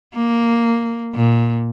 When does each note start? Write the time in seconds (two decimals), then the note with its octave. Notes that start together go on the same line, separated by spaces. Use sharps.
0.14 A#3
1.14 A#2